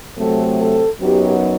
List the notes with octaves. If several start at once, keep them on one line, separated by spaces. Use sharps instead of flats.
C3 F#3 A3 C4 A4
A4
F#2 F#3 B3 D#4 G4